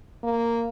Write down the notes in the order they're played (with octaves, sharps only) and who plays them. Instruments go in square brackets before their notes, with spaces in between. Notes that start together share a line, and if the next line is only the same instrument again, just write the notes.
[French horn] A#3